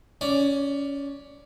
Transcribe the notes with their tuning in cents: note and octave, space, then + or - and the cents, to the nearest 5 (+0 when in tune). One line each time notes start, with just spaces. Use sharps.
C#4 +15 D5 +0